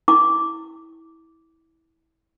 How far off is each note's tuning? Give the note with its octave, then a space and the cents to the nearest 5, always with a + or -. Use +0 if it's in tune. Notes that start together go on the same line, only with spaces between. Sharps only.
E4 -20 D6 -10